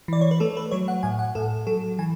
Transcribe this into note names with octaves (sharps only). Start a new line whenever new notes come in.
E3 D5
C#5
B4
A3 A4
B4
F#3 C#5
F#5
A2 G#5
F#5
A2 A4
F#3 A4
E3 G#5